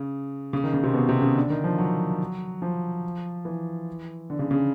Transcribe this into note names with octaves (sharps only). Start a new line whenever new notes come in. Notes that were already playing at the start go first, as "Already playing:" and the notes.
Already playing: C#3
C#3
D#3
C#3
C3
B2
C3
C#3
D3
D#3
F3
F#3
F3
E3
D3
C#3
C#3